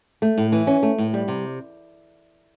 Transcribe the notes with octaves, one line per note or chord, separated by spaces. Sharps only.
A3
A2
E3
C#4
A3
A2
G3
C3